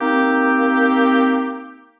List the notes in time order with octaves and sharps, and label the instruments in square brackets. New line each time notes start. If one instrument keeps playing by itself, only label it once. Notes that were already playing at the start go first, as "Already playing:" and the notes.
[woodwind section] A#3 C4 D#4 G4